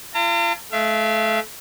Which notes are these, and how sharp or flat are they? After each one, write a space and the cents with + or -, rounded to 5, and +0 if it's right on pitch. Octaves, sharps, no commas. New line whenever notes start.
F4 -40 A#5 -45
A3 -30 F5 -45